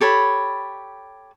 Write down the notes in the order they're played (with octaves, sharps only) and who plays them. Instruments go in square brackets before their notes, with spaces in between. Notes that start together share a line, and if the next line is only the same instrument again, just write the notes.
[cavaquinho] G4 A4 C#5 B5